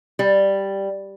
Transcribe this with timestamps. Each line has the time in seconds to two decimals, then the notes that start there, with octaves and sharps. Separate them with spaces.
0.19 G3